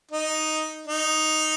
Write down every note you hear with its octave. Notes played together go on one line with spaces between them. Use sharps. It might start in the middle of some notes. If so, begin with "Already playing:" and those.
D#4
D#4